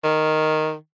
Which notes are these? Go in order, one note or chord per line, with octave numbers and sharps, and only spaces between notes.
D#3